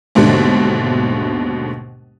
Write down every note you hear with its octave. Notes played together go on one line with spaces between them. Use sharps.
D#2 G#2 B2 D3 A3 D4